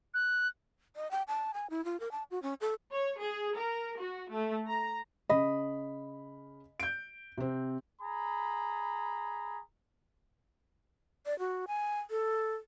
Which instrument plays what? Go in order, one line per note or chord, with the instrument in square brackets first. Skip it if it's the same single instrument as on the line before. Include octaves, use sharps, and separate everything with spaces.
[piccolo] F#6
[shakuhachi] D#5
G5
A5
G#5
E4
F4
A#4
A5
F#4
C#4
A4
[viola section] C#5
G#4
A#4
F#4
A3
A#5
[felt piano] C#3 B5 [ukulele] D#5
[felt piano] G6 D7
C3 C4
[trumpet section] G#4 A#5 B5
[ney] D5
F#4
G#5
A4